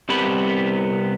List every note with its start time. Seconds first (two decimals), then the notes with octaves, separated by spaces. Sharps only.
0.09 C2 C3 B3 G4 B5